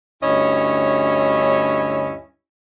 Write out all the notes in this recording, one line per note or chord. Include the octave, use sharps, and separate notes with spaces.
D2 G2 C#4 E4 C#5 D#5